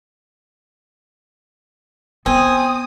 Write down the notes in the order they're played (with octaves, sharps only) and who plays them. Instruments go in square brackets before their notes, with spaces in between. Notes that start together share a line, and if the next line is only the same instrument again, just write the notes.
[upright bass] B3 [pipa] C4 [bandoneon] G#5 [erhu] D#6